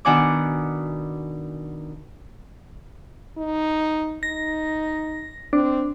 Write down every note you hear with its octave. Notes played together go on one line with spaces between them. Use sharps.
B2 D#3 D4 F#5 G#5 D6
D#4
D#4 A#6
C4 D4